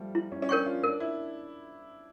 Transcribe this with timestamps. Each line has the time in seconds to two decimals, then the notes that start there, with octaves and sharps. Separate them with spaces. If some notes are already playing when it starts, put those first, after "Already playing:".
Already playing: F3 G3 A3
0.15 E4
0.32 C#4
0.42 C#4
0.49 D4 A#4 C#5 G5 C#6
0.66 F4
0.84 D4 A#4
1.00 E4